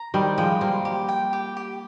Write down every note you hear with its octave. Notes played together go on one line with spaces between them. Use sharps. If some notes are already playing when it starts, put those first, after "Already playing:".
Already playing: A#5
D#3 G3 C5
F3 G#3 G5
G3 A#3 C5
G4
G5
G4
G4